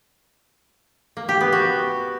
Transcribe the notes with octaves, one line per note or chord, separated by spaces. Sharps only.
A#3
G4
B3
F#4